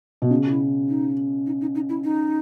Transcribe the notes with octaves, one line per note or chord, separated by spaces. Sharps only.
B2
C#3 D#4
F#4
E4
D#4
D#4
D#4
D#4
E4
D#4